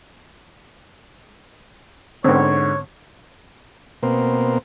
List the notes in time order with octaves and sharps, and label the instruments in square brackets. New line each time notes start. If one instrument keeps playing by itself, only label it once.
[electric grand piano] G#2 D3 [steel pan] B3 C4 [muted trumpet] C#5
[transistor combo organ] B2 A#3 C4